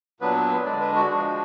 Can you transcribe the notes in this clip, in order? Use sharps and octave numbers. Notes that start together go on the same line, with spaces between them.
A#2 F#3 B3 D4 B4
D3 G#3 D4 D5
B4
F#4
F3 G#3 D4